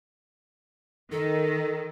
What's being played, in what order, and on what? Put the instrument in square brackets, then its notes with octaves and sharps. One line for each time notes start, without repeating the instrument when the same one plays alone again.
[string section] D#3 [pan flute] A4